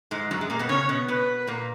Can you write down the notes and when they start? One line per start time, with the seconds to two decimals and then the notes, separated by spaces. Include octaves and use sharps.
0.11 G#2 G#3
0.31 F#2 F#3
0.41 G#3
0.50 A#2 A#3
0.59 B2 B3
0.69 C#3 C#4 C#5
0.89 B2 B3
1.08 B2 B3 B4
1.47 A#2 A#3